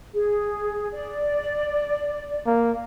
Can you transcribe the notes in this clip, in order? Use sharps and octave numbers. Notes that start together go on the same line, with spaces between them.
G#4
D5
A#3